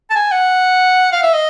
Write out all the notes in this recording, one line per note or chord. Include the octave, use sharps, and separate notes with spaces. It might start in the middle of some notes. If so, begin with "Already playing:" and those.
A5
G#5
F#5
F5
E5
D#5